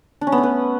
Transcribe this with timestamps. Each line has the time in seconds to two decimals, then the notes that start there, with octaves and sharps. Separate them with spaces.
0.21 D4
0.27 C#4
0.32 B3
0.38 A3
0.43 B4